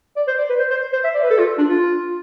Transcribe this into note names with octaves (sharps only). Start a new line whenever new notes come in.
D5
C5
D5
B4
C5
C5
C5
E5
D5
B4
A4
F4
D4
F4